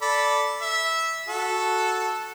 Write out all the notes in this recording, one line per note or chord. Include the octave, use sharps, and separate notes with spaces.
A4 D5 B5
E5
F#4 A4